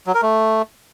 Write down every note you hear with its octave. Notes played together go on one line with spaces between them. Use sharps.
F#3
A#4
A3